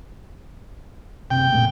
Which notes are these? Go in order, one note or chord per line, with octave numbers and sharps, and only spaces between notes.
F#1 C3 G5
A#2 A3 B3